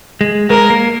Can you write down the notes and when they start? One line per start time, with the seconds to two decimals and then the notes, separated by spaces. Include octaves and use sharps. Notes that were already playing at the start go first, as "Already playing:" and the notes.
0.21 G#3
0.50 G#3 A#4
0.70 A#3